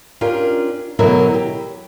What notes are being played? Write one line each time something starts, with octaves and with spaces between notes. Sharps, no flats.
C#4 D4 F4 G4 A#4
B2 D3 E3 F#3 A#4 E5
G4